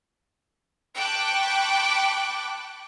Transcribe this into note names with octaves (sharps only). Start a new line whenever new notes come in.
G5 A5 B5 C#6 D6 F#6